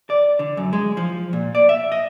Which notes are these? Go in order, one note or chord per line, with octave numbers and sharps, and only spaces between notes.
D5
D3
F#2
G#3
F3
A#2
D5
E5
D#5